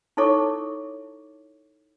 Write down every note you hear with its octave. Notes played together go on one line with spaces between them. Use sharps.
D#4 E4 A4 C#5 C#6 D6